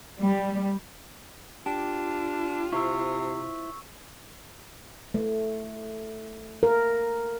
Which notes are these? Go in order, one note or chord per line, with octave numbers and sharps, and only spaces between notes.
G3
D4 F4 G4
C3 E4 C5 C#6 E6
A3
A#4